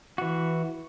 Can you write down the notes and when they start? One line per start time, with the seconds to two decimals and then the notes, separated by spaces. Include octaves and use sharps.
0.18 E3 F#4